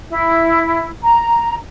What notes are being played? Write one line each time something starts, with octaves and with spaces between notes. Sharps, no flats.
E4
A#5